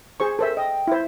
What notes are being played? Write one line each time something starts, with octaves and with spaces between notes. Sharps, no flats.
G#4 C5 C#6
A4 A#4 C5 E5
D#5 G5
E4 C5